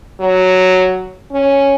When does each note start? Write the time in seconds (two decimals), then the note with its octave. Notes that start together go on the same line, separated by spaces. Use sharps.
0.20 F#3
1.31 C#4